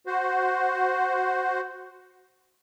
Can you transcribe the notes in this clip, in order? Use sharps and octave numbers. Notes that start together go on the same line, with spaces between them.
F#4 C5